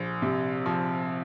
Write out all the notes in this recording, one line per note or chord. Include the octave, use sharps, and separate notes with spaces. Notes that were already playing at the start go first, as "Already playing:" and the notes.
Already playing: A#1
C3
F3